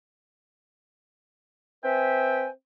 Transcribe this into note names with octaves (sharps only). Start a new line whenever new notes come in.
C4 B4 E5 G5 G#5